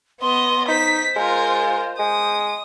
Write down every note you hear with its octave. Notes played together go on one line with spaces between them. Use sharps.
B3 D#5 C6
D#4 C5 B6
G#3 F4 A#4
G#3 D#6